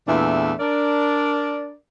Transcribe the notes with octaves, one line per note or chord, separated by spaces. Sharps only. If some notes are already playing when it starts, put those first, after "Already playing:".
E2 A#2 E3 A3 D4 E5
D4 A#4 D5